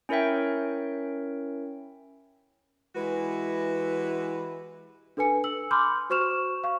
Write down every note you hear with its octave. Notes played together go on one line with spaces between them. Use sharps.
C#4 E4 A#4 C#5 E5 G5
E3 G#3 E4 F#4 G4 B4
D4 A4 B4 G#5 C#7
E6 F#7
B5 C6 D6 F6 G6
F#4 C5 C#6 F6 E7 F7
F5 C#6